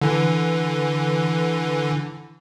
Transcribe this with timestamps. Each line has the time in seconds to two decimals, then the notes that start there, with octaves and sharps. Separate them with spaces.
0.02 D3 E3